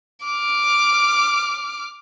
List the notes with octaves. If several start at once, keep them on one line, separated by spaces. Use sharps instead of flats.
D6 F6